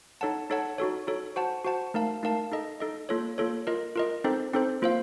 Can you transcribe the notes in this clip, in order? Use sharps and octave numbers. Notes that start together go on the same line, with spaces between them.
D#4 A4 C#5 F#5 A5
D#4 A4 C#5 F#5 A5
D#4 F#4 A4 C#5
D#4 F#4 A4 C#5
F#4 C5 F#5 A5
F#4 C5 F#5 A5
A3 D#4 A#4 F5 A5
A3 D#4 A#4 F5 A5
D#4 A4 D#5
D#4 A4 D#5
A#3 F4 A4 C#5
A#3 F4 A4 C#5
F4 A#4 D#5
F4 A#4 D#5
C4 D#4 A4 C5
C4 D#4 A4 C5
A#3 F4 C5 F5